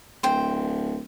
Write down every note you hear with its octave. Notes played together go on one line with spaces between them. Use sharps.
D1 C5 G5